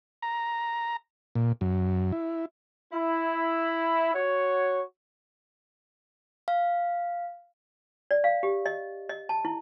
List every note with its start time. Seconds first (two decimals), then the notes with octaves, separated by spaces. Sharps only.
0.22 A#5
1.35 A#2
1.61 F#2
2.12 E4
2.93 E4
4.14 F#4 C#5
6.48 F5
8.11 D5
8.24 F5
8.43 G4
8.66 D#5
9.09 D#5
9.29 A5
9.45 E4